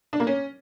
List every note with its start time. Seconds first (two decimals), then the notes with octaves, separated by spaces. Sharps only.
0.13 D4
0.20 A#3
0.27 C#4